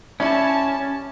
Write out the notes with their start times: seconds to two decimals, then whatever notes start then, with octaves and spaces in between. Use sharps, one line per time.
0.20 G3 C#4 E4 A5